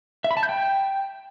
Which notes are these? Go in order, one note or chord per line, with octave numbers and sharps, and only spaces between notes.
E5
B5
A5
G6
G5